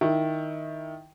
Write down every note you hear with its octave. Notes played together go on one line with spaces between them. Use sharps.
D#3 E4